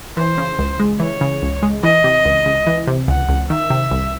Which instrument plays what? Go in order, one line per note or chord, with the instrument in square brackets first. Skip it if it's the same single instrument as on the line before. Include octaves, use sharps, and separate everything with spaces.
[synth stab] E3 [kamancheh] C5
[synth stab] C#3
C#2
G#3
[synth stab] E3 [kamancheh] C#5
[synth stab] C#3
C#2
G#3
[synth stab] E3 [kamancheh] D#5
[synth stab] C3
C#2
C#2
E3
C3
[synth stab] C#2 [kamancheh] F#5
[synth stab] C#2
[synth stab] D#3 [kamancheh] E5
[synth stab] C3
C2